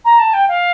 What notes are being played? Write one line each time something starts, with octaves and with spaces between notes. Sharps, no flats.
A#5
A5
G5
F5